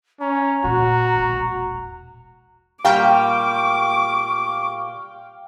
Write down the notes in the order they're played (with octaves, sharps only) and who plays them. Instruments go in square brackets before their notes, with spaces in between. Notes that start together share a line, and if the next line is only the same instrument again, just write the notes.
[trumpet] C#4 [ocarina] A#5
[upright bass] A#2 C#3 [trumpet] F#4
[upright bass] E1 A#1
[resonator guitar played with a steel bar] A#2 G3 G4 [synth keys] F5 G5 F6 [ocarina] C#6 [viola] D6